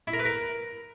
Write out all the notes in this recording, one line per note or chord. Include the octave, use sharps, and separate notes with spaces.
E4
A#4
B4
A#4